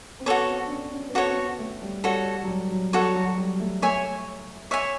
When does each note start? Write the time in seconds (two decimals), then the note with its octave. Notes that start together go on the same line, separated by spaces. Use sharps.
0.20 C4
0.26 B3 F#4 A4 C#5
0.49 C4
0.66 D4
0.70 C#4
0.93 C#4
1.09 B3
1.14 C4 F#4 A4 C#5
1.28 C4
1.36 B3
1.59 A3
1.82 G3
2.04 G3 F#4 A4 C#5
2.43 F#3
2.48 G3
2.70 F#3
2.93 F#4 A4 C#5
3.15 F#3
3.38 G3
3.60 A3
3.81 A3 C#5 E5 G#5
4.71 C#5 E5 G#5